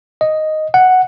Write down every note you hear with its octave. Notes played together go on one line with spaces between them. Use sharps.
D#5
F#5